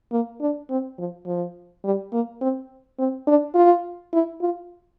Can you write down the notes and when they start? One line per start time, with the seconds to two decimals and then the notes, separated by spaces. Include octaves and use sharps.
0.12 A#3
0.40 D4
0.70 C4
0.98 F3
1.26 F3
1.84 G3
2.12 A#3
2.41 C4
2.98 C4
3.27 D4
3.55 F4
4.13 E4
4.41 F4